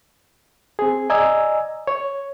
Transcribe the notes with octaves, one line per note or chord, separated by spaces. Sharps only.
C4 G#4
D5 D#5 G#5 A#5 E6 G#6
C#5